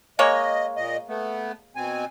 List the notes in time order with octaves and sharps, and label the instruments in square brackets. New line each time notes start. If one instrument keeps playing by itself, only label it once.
[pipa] G#3 A#3 C#5 [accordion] D#5
[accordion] A#2 D#5
A3 B3
B2 C4 G#5